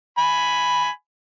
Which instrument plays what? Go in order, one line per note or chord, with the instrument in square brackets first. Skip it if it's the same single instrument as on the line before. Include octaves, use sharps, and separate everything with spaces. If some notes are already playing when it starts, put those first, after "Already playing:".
[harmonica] G#5 B5